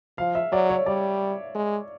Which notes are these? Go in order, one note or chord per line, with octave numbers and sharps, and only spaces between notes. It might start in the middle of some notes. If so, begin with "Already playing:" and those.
F3 F5
E5
F#3 D5
C#5
G3 D5
G#3